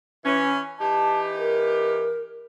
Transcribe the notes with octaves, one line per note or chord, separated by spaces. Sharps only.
E3 C#4
E3 D#4 G4 A5
A#4